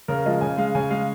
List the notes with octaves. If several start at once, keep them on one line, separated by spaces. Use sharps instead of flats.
C#3 A#4
F3 G#3 D#5
C#3 G#5
G#3 F5
C#3 G#5
G#3 F5